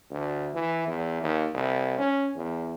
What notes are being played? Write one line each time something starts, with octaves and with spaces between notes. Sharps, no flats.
D2
E3
E2
D#2
C2
C#4
E2